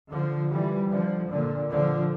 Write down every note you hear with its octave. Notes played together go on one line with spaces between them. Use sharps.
D3 F3
E3 G3
D3 F3
A#2 D3
D3 F3